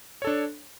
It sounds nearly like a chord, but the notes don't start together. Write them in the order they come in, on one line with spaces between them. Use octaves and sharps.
C#5 A4 D4